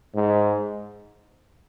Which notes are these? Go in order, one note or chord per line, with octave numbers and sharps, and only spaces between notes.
G#2